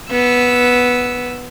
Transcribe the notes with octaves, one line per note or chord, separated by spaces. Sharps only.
B3 E6